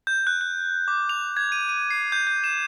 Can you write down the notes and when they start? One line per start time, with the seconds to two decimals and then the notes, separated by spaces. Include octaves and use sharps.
0.07 G6
0.27 F#6
0.41 F#6
0.88 D6
1.09 F7
1.37 G#6
1.52 D#7
1.69 D#7
1.90 C7
2.12 G6
2.27 G6
2.44 E7